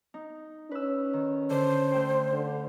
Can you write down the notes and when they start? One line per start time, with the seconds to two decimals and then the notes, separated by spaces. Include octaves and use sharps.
0.14 D#4
0.71 C#4 B4 E6
1.13 D#3
1.50 D3 C5
1.92 D2 G5
2.33 D3